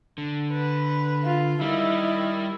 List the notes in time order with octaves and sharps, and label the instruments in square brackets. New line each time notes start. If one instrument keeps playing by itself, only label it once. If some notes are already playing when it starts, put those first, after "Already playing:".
[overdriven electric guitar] D3
[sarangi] B4
[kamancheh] F4
[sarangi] D#3 [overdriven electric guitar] G3 [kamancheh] E4